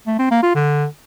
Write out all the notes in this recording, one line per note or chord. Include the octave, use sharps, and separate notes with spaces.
A3
C4
A#3
F4
D3